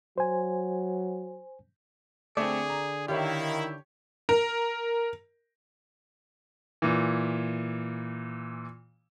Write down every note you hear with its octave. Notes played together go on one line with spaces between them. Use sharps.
F#3 C5 G#5
D3 A3 C4 G#4 D5
A#5
D#3 E4 G4 C#5 F5
A#4
A#2 E3